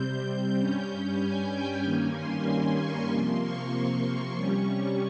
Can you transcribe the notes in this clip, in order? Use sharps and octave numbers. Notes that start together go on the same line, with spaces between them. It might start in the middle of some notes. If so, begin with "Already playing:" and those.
Already playing: C3 G3 C4 G6
G2 G3 C#4
G#5
G5
G2 D#3 G3 A#3 C#4 G#5
C6
C6
C#6
C3 F3 A#3 C6
C#6
C3 G3 C#4